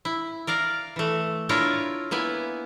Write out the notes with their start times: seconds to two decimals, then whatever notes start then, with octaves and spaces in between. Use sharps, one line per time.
0.05 E4
0.47 A#4 D5 F5 A#5
0.96 E3 A3
1.49 D4 E4 F4 A#4 C#5 D5
2.11 A#3 B3 E4 G#5